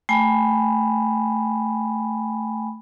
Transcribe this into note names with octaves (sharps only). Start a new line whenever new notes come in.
A3 G5 G#5 B5